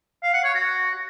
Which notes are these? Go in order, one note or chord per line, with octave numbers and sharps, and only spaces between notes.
F5
F#5
C#5
F#4